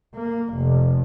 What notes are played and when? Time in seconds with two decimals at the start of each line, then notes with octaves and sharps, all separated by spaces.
0.15 A#3
0.54 F1